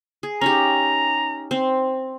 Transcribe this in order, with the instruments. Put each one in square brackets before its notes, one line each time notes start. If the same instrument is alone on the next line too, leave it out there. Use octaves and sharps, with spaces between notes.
[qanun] G#4
[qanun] C#4 D#4 G4 [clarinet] A#5
[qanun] C4